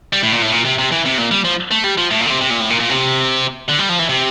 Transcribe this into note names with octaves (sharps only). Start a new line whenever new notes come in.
G3
A2
A#2
A2
A#2
C3
C3
E3
C3
A#2
G3
F3
A3
G3
F3
A2
A#2
D3
C3
C3
A#2
A2
A#2
A#2
C3
D3
G3
F3
E3
C3